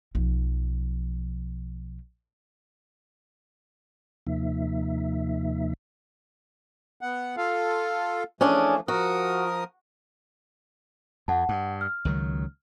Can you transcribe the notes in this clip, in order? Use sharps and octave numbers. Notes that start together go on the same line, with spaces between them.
B1 F3
D#2 C3 F3 A#3 D#4 E5
B3 F#5
F4 A4 F5
E3 F3 A3 C#4 D4 G#4
F3 F#4 A#4 D#6
F2 F#5 A5
G2
F6
C#2 D#3 F#3